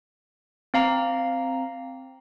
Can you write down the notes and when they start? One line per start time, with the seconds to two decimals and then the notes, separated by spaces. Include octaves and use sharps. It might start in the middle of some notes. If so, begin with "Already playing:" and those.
0.74 C4 F5 A#5